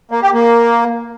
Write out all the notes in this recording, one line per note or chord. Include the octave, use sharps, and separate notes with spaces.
A#3
G4
A#3